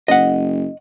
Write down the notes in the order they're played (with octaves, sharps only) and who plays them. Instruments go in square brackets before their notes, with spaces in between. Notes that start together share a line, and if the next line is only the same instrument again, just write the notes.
[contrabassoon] F#1 [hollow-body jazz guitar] D#5 F#5